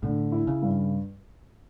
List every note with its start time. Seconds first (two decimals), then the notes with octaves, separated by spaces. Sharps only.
0.03 A2 D3
0.32 E4
0.47 C#3
0.62 G2